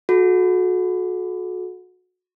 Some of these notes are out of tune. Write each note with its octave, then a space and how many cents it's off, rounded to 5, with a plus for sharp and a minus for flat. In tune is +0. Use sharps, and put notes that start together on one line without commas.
F#4 -25 A4 -40